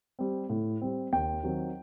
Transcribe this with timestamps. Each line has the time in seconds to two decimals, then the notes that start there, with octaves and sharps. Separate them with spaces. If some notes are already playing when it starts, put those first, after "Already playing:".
0.19 G3 C4
0.50 A2
0.81 G3 C4
1.12 D#2 G5
1.43 D#3 F#3 C4